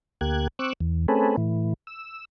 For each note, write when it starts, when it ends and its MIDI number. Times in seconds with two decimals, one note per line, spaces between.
0.21 0.48 38
0.21 0.48 58
0.21 0.48 67
0.21 0.48 90
0.21 0.48 92
0.59 0.73 60
0.59 0.73 85
0.59 0.73 86
0.59 0.73 88
0.59 0.73 90
0.81 1.06 40
1.08 1.36 57
1.08 1.36 60
1.08 1.36 61
1.08 1.36 68
1.08 1.36 69
1.08 1.36 71
1.37 1.74 45
1.37 1.74 52
1.87 2.25 88